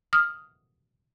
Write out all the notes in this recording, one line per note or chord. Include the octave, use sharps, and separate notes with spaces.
D#6 F6